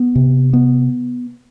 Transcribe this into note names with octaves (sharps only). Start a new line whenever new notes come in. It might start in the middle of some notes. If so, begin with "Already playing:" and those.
Already playing: B3
C3
B3